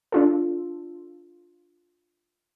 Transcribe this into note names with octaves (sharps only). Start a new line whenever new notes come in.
D4 F4 A4